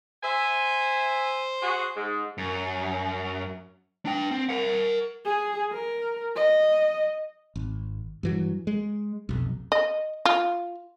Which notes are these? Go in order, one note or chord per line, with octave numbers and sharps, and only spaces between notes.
C5 E5 G#5
F#4 G#4
G#2
F#2
D4 G5
C4
A#4 F#5
G#4
A#4
D#5
G#1
G2 E3 F#3
G#3
F1 B1
D#5
F4